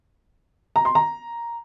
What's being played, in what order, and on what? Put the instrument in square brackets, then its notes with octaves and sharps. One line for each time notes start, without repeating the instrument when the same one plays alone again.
[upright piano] A#5
C6
A#5